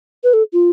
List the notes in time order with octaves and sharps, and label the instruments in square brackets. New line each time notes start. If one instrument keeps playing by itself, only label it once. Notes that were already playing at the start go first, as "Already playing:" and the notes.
[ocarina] B4
A4
F4